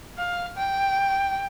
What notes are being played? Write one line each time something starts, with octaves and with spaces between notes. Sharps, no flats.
F5
G5